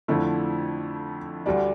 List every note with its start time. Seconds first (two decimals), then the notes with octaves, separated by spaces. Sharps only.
0.08 F2 D3 F3 A3 E4
1.46 D2 D3 G3 D4